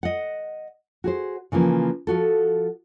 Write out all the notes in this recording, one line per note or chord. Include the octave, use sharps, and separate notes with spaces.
D#5 F#5
F#4 G#4 C5
C#3 E3 F3 A#3
F3 F#4 A4